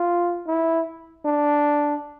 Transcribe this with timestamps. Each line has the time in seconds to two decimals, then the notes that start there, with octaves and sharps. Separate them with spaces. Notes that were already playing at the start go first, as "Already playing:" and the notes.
Already playing: F4
0.47 E4
1.25 D4